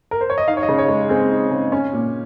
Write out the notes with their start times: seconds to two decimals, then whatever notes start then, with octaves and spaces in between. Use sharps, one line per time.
0.11 A#4
0.21 C5
0.30 C#5
0.38 D#5
0.48 D#4 F5
0.57 C#5
0.63 D#5
0.69 C#3
0.78 C#5
0.88 G#3
1.09 C4 G#4
1.30 D#4
1.51 C#3
1.72 C#4
1.93 A#2